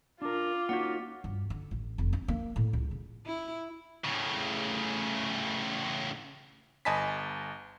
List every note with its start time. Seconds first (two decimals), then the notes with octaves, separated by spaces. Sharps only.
0.22 D4 F4 A#4 D6
0.69 A#3 C#4 D#4 F#4 F#5
1.24 G2
1.50 D3
1.71 A1
1.98 F1
2.13 C#4
2.28 A#3
2.56 A2
2.73 C#2
2.91 C#3
3.26 E4
4.05 A2 C#3
6.85 G1 D#5 G#5 A5 B5 B6